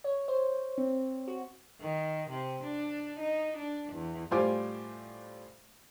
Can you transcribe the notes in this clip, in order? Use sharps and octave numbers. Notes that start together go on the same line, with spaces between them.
C#5
C5
C4
F#4
D#3
C3
D4
D#4
D4
E2
A2 G3 F4 C5 G#5 D6